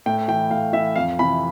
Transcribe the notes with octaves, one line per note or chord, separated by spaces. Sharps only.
A2 G5
E3 G5
A2 F5
E3 E5
F2 F5
C3 E3 B5